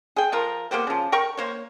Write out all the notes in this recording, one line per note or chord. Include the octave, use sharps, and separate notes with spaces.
G#4 G5
F3 F4 A#4
A#3 B3 G4 C5
C#3 F3
A#4 G5 C#6
A#3 C5 C#5